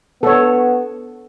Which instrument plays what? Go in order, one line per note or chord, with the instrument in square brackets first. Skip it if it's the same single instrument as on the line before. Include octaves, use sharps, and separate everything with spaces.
[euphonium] B3 [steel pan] A4 C#5